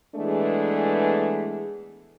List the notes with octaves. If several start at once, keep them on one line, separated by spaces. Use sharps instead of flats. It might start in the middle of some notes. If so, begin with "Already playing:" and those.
E3 G#3 A3 B3 D4 G#4